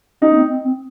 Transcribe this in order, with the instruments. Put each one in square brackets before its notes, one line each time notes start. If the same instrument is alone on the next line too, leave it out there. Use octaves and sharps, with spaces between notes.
[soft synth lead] C#4 [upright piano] D#4
[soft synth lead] A#3
C4
C4
C4